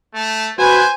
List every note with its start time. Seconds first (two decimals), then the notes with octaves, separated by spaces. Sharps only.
0.14 A3
0.59 F#4 B4 C5 G#5